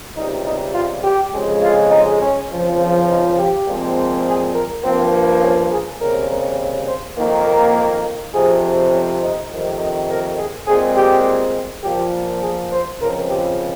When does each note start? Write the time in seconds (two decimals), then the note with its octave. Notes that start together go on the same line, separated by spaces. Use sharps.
0.16 C#2 C3 G3 D#4
0.46 D#4
0.75 F4
1.04 G4
1.34 F2 C#3 G#3
1.63 F4
1.92 D#4
2.22 C#4
2.50 C#2 C#3 F3 C4
3.08 D#4
3.37 G4
3.68 A#2 F3 G#3 C4
4.26 G#4
4.55 A#4
4.84 G2 F3 A#3 C4
5.43 C#4
5.72 G#4
6.01 D#2 C#3 G3 C4 A#4
6.88 C5
7.18 F2 D#3 A#3
7.47 A#4
8.34 F2 C3 F3 C4 G#4
8.93 C#4
9.22 D#4
9.51 F2 C3 D#3
9.81 D#4
10.09 A#4
10.39 G#4
10.67 A#2 G#3 C4 G#4
10.97 G4
11.84 A#2 F3 A#3 G4
12.42 G#4
12.73 C5
13.01 C#2 C#3 F3 C4 A#4
13.30 G4